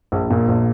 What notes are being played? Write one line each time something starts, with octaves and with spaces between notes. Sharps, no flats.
A#1
A#2
A#1